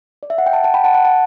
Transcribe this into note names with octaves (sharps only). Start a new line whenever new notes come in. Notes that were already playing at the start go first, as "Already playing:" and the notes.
D5
E5
F#5
G5
F#5 A5
F#5 A5
G5 B5
F#5 A5
F#5 A5
F#5 A5